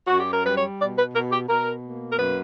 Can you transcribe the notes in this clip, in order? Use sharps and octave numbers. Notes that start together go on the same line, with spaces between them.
F#2 F#4
G4
A#4
G3 B4
C#5
B2 D5
B4
B2 A#4
G4
B2 A#4
A#3
A#4
F#2 B4